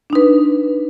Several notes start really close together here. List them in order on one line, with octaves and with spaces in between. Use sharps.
D4 D#4 B4